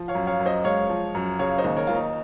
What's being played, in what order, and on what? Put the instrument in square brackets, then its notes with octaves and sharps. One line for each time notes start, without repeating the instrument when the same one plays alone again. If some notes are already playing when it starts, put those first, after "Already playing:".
Already playing: [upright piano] F3
C#5 F5
F#2
C#5 F5
F#2
C5 D#5
G#3 C#5 F5
F3
F#2
C#3 C#5 F5
C5 D#5
D#2
A#4 C#5
D#2 F4
D#4